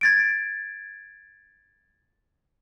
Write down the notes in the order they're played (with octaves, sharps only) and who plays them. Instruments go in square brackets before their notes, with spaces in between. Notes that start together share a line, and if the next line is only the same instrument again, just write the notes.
[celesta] G#6 A6 D7